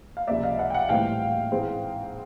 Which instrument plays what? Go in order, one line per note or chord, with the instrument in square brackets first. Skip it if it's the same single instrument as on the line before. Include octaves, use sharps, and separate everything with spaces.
[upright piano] F5
C#2 C3 F3 A#3 D5 E5
D#5 F5
E5 F#5
G5
E5 F#5
A#1 A2 E3 G3 C4 F5 G5
G#2 E3 G#3 C4